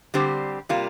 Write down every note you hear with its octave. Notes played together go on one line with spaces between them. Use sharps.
D3 G3 C4 G4 C5
C3 G3 A#3 F4